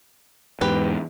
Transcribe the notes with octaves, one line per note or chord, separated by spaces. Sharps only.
E2 G#2 G4 B4